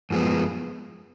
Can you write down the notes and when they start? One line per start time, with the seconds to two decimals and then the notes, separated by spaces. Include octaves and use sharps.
0.10 F#2 F3 G#3 B3